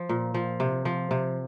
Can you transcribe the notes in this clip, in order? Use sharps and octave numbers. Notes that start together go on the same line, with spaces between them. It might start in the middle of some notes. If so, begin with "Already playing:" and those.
Already playing: F3
A#2
F3
C3
F3
C3